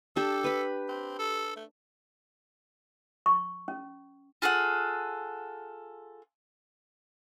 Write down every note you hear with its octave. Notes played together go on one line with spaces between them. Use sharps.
D4 G4 A4
B4 B5
C4
A4
A3
C#6
C#4
F4 G#4 A4 F#5